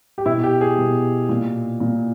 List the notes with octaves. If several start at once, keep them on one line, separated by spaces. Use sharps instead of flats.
G4
B2 E4
G4
G#4
B2
A#2
A#2